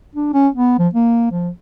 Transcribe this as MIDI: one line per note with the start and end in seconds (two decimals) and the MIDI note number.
0.15 0.31 62
0.34 0.48 61
0.55 0.78 59
0.79 0.88 53
0.94 1.30 58
1.31 1.49 53